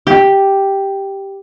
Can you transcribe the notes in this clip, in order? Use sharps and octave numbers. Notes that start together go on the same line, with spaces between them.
G4